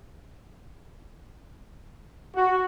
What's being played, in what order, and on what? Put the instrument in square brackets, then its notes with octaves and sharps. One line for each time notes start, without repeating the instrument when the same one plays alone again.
[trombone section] F#4